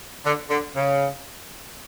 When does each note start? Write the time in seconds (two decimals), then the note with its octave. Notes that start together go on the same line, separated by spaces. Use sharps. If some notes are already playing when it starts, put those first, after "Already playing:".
0.24 D3
0.50 D3
0.75 C#3